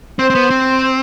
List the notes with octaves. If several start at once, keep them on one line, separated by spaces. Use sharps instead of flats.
C4 C5
C4
B3
C4